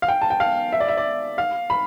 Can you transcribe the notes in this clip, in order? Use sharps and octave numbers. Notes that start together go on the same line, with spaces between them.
F5
G5
A5
G5
F5
E5
D5
E5
D5
F5
B5